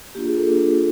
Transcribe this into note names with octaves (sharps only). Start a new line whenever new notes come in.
A#3 D4 F4 G4
G#4
A4
A#3 D4 F4